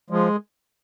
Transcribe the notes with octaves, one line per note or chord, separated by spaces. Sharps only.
F3 G#3